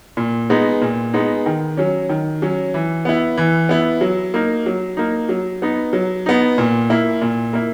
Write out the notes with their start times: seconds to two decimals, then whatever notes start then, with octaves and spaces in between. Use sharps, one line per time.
0.17 A#2
0.50 G#3 B3 D#4
0.81 A#2
1.13 G#3 B3 D#4
1.46 D#3
1.77 F#3 C#4
2.09 D#3
2.42 F#3 C#4
2.74 E3
3.05 B3 E4
3.37 E3
3.69 B3 E4
4.01 F#3
4.34 A#3 D#4
4.66 F#3
4.97 A#3 D#4
5.29 F#3
5.62 B3 D#4
5.93 F#3
6.26 B3 D#4
6.58 A#2
6.90 A#3 E4
7.22 A#2
7.53 A#3 E4